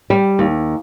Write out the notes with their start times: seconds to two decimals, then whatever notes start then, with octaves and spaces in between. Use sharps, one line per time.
0.10 G3
0.39 D#2